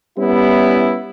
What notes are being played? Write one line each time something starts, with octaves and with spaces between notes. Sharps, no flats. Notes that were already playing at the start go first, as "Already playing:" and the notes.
G3 B3 C#4 E4